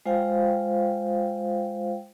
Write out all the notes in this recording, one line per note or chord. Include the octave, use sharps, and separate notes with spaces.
G#3 F4 C5 F5 G5